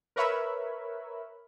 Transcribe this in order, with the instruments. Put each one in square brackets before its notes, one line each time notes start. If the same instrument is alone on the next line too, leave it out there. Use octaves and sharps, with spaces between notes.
[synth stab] A#4 B4 C#5 E5 B5